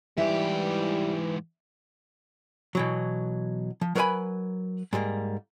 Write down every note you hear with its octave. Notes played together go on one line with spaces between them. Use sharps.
G#2 E3 G3 G4 E5
B2 E3 F#3
F3
F#3 A#4 B4 D5 G#5 B5
G#2 G3 A3 A#3